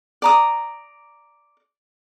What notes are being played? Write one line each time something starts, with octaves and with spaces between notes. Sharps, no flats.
D5 A#5 D#6